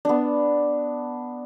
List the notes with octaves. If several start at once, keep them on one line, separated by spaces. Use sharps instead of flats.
B3 D4